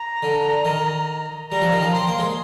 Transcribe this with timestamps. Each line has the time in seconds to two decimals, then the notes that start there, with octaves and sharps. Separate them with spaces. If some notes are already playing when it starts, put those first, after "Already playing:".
Already playing: A#5
0.23 D3
0.65 D#3
1.51 G3 A#5
1.62 F3
1.72 D#3
1.81 F3
1.94 C4 C6
2.07 A#3
2.19 G#3